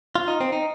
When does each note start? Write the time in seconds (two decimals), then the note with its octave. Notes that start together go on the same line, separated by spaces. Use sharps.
0.16 F4
0.28 D#4
0.41 C4
0.52 D#4